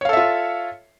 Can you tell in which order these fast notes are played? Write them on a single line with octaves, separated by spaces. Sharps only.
C#5 F5 A4 E5 F4